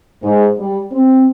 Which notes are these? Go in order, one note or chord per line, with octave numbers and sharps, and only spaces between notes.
G#2
G3
C4